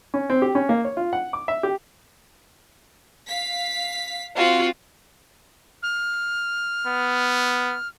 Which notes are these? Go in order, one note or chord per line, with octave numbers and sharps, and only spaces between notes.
C#4
C4
G4
C#4
A#3
C#5
F4
F#5
D6
E5
G4
F5 B6
C4 F4 F#4
F6
B3